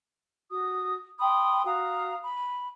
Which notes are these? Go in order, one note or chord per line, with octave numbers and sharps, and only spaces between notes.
F#4 D#6
G5 B5 C6 D#6
F#4 F5 A#5 D#6
B5